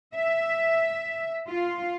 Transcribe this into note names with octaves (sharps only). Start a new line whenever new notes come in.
E5
F4